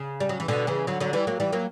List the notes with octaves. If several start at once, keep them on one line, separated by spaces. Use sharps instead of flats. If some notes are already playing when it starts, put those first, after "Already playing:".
Already playing: C#3
G3
F#3
E3
B2 D3
C#3 E3
D3 F#3
D3 F#3
E3 G3
F#3 A#3
E3 G3
F#3 A#3